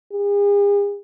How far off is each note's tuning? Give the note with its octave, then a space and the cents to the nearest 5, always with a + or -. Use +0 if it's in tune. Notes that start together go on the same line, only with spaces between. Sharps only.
G#4 -45